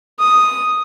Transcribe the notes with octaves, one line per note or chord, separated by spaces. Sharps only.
D#6